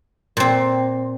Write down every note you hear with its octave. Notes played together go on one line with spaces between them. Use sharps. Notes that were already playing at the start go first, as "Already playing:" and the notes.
A#2 C4